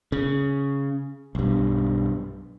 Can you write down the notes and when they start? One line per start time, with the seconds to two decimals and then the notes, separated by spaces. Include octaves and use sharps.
0.12 C#3
1.35 B1 G2